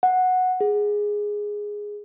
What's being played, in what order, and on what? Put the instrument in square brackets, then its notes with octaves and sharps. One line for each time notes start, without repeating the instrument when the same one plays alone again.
[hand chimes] F#5
G#4